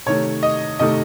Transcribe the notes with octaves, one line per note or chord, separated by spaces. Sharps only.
C3 D#3 A3 C#5
D#5
C3 D#3 A3 D#5